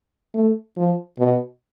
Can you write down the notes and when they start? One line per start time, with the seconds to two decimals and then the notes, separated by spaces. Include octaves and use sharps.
0.35 A3
0.77 F3
1.19 B2